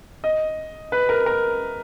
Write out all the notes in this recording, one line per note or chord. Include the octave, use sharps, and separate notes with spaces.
D#5
B4
A#4
A#4